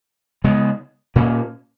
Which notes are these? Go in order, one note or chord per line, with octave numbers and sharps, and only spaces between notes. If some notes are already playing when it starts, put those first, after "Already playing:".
C#3 G#3 B3
A#2 A#3 C#4